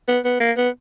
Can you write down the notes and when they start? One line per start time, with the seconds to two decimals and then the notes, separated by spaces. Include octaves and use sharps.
0.08 B3
0.25 B3
0.40 A#3
0.57 B3